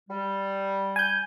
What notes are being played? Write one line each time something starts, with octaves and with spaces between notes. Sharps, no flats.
G3
G#5 G6